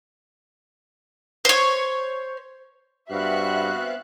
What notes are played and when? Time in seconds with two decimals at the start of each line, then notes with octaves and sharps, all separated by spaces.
1.45 C5 C#5
3.11 G2 B3 C4 F#4 E5 F5 F#6